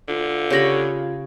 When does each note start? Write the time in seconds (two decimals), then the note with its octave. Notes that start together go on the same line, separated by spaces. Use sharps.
0.08 D3 F4
0.50 C#3 G4 C#5 B5 A#6